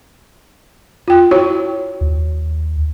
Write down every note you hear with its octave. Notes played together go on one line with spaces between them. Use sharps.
F4 G5
E4 F#4 C#5
D#2